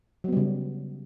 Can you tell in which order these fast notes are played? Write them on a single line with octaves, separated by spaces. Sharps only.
F#3 B3 G3 C#3